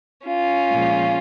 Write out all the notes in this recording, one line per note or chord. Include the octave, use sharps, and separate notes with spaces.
C#4 F4
A#2 F3 G#3